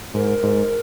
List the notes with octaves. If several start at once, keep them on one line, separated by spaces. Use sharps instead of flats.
G#2 A#4
G#2